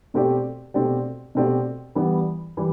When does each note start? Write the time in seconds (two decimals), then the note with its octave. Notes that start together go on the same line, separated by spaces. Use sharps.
0.14 B2 A3 C4 G4 D5
0.74 B2 A3 C4 G4 D5
1.35 B2 A3 C4 G4 D5
1.95 E3 G3 B3
2.57 E3 G3